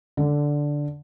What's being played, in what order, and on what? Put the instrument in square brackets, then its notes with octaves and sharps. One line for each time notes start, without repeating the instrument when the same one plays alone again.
[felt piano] D3